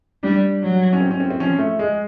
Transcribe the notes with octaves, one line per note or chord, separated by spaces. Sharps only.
G3 D4
F#3
C#4
C4
C#4
C4
C4
F3 C#4
A3
G#3